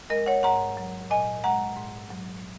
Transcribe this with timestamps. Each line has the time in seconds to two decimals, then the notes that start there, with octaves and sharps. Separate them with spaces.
0.10 G#3 A#4 D#5
0.26 C#5 F#5
0.43 G#2 F#5 A#5
0.77 F#3
1.10 A#2 D#5 G#5
1.44 G#3 F#5 A#5
1.77 G#2
2.10 F#3